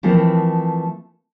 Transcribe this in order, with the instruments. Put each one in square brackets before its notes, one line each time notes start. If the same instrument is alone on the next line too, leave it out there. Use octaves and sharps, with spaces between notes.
[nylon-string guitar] E3 F3 A3 C4 E4 A#4